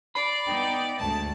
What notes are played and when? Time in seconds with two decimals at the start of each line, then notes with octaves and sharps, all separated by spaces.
0.15 D5 B5 C7
0.47 B3 D#4 G5
0.99 D2 G#2 A5